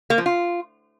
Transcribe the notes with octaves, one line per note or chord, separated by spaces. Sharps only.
A#3
F3
F4